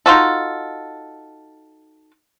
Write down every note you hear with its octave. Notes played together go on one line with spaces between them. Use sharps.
D#4 F4 F#4 A4